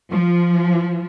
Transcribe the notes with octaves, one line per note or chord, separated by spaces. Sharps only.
F3